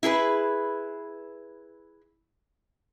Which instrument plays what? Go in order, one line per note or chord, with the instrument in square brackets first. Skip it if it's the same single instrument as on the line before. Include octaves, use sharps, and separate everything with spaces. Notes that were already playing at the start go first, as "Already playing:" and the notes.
[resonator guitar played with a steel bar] E4 G#4 A4 B4